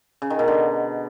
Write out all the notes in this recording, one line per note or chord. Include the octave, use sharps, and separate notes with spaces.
C#3
D#3
B2
D3